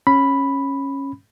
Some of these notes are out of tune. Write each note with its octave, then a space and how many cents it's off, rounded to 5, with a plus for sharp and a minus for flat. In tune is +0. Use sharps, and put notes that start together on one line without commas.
C#4 -15 B5 +0